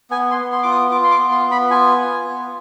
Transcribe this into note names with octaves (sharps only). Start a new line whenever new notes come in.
B3 G#5
C6
B3
C6
F4 D6
D#6
F4 D6
C6
D6
B3
C6
B3
B5
F4 G#5
F4
B3